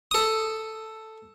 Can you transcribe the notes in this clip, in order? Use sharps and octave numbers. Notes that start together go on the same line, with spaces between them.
A4 D#6